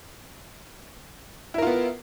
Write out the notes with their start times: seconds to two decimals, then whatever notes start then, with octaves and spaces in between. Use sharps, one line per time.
1.54 E4
1.58 A#4
1.62 F4
1.67 B3